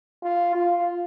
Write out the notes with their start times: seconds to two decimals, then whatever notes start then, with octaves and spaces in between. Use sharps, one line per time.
0.23 F4
0.55 F4